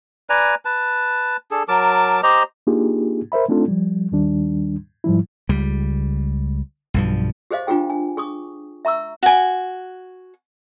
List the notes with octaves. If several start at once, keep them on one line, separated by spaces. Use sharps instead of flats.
B4 D5 G#5 A#5
B4 A5
D4 G#4 A4
F#3 A#4 A5 D6
G4 C5 D#5 A#5
A#3 D4 D#4 F4 G4 G#4
A#4 C5 E5 B5
A3 C4 D4 D#4 F4 A4
F3 G3
D#2 D#3 G3 D4
G#2 F3 G3 E4
C#2 G3
B1 G2 F3
G4 G#4 C5 D#5 F5
D4 F4 G4 G#4 G5
G#5
G#4 C#6 D#6
E5 A#5 C#6 E6
F#4 G#5